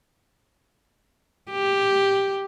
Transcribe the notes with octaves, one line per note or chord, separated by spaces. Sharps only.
G4